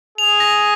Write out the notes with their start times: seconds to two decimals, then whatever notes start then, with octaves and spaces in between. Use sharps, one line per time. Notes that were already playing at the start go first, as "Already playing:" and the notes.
0.18 G#4 F7
0.40 A#6